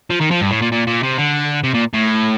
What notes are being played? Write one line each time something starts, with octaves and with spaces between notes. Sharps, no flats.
F3
D#3
F3
G2
A2
A#2
A#2
A#2
C3
D3
C3
A#2
A2